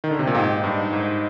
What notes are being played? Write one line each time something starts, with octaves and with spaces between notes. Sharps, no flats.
D#3
D3
C3
A#2
G#2 A#3 D#4 G4
G2
G#2